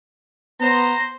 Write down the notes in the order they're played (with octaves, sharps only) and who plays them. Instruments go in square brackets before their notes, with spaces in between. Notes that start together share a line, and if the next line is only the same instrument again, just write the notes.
[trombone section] B3 [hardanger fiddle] C5 C6 [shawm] A#5